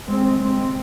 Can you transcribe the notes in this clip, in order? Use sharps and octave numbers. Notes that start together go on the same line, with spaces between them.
D#2 C#3 G#3 C4
G#3 C4